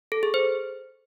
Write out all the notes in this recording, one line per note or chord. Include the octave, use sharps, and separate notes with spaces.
A4
G#4
C5